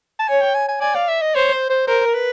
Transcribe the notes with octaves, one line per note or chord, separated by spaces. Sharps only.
A5
C#5 G#5
G5
G#5
G#5
D5 G#5
F5
E5
D#5
C5 C#5
C5
C5
A#4 C5
A#4
B4